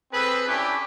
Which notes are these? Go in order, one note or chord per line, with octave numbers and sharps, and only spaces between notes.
C4 G#4 A4 B4
C#4 D4 E4 G4